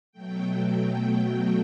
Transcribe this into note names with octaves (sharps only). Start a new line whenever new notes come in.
B2 F#3 A3 G5
G5